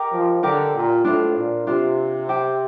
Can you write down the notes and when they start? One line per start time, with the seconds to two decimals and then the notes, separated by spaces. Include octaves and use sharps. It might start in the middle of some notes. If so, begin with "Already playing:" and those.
Already playing: G4 A#4 D#5 A#5
0.12 F3
0.43 D3 G4 A#4 D#5 A#5
0.75 A#2
1.04 A2 D4 F4 C5
1.36 A#2
1.67 C3 D4 F4 C5
2.29 G4 C5 G5